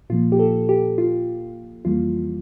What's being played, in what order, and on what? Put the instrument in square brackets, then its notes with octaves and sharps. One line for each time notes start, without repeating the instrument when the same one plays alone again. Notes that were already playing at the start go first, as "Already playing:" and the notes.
[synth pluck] A#2 F3 A#3 F4
G4
A4
G4
F4
F2 E3 G3 A#3 F4